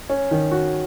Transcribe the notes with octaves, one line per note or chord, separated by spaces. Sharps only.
C#4
D#3
F#4